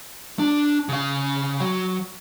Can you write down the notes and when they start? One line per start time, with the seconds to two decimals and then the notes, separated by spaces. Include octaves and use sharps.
0.39 D4
0.89 C#3 F5
1.60 F#3